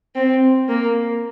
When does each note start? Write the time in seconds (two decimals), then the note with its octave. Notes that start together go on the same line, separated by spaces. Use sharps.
0.15 C4
0.69 A#3